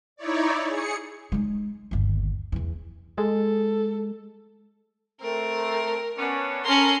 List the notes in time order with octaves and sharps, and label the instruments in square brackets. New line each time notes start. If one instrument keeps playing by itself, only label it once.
[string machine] D#4 E4 C#5 D5
G#4 C#7
[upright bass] G#3 D#4
G1 D#2
E2 E3
[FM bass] G#3 [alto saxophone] A4
[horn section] A3 C4 [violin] A#4
[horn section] B3 C#4 D4
[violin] C#4 C6 [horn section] A4 A#4 A#5